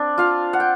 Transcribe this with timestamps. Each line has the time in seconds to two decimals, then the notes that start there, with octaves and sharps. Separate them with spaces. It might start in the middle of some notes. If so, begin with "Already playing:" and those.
Already playing: C4 D4 D5
0.18 F4 F5
0.53 F#5
0.60 G5